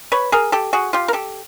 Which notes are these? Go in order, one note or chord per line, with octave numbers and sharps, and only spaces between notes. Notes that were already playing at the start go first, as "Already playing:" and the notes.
B4 C#5
G#4 A#4
G4 A4
F#4 G#4
F4 G4
A#4
G4 A4